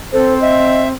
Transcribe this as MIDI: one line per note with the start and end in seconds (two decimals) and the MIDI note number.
0.13 0.92 60
0.13 0.39 69
0.13 0.34 72
0.41 0.83 75
0.41 0.88 76